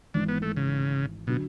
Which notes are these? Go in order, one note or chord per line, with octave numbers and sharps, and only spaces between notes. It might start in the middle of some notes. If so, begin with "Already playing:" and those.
G#1 G#2 E3 D4
B3
A3
C#3
B2 D3 F#3